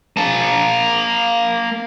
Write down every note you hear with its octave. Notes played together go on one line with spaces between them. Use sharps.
A#3 A5